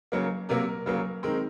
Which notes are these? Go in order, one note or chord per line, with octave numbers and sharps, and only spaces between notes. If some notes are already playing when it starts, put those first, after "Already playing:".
C#3 F#3 A#3
C3 F#3 A#3 A#4
C#3 F#3 A#3
D#3 G#3 C4 A#4